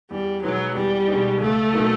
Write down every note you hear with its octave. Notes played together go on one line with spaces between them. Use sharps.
E2 G3
B2 F#3 G#3 B3 D#4
E2 G3
B2 G#3 B3 D#4
C#2 A3
B2 F#3 A#3 D#4